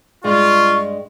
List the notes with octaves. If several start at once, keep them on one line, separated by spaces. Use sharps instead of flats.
G2 G#3 F4 C#6